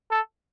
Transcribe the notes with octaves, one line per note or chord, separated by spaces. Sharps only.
A4